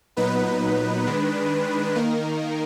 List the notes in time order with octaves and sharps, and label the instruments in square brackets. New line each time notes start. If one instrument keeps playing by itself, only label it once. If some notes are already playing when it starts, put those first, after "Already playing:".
[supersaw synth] A#2 F#3 B3 D#4 B4
D#3 G#3 D4
D#3 A#3 D#4 A#4